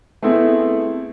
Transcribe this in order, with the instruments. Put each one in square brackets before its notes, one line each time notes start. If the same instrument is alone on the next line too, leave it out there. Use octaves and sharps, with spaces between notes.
[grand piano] A3 B3 C4 E4 G#4